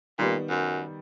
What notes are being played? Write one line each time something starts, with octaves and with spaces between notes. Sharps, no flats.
A#2 D#3 G3 B3
F#2